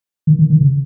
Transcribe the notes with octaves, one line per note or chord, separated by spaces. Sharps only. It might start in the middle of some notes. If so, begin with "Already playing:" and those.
D#3
D#3
D#3
C#3